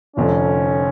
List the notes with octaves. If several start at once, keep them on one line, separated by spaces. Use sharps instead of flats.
F1 F2 D3 C#4